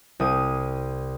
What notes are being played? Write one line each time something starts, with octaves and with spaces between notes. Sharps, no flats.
C2 D#6 D#7